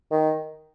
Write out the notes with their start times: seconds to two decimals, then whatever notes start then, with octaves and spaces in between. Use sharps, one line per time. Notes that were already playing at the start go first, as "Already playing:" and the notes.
0.12 D#3